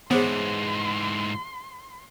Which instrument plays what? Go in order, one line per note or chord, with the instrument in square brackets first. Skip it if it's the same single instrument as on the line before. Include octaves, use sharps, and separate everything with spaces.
[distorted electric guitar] G#2 E3 [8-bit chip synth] B3 [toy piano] G#4 C5 C#5 [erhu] C6